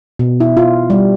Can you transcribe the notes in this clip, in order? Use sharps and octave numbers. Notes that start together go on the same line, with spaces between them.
B2
E4
F4
G3